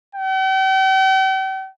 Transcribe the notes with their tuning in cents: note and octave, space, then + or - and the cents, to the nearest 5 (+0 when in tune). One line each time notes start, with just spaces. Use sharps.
G5 -45